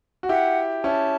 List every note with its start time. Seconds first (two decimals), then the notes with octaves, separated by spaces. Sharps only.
0.23 F#4
0.29 E4 G4 F#5
0.83 C#4 E4 A5